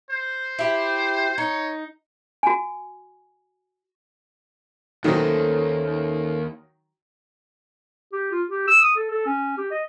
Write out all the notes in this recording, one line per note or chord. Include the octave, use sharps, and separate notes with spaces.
C5
E4 G4
D#4 C#5
F#4 G#5
D#2 D#3 F#3 A3 C#4 C5
G4
F4
G4
E6
D#6
A4
A4
C#4
G4
D#5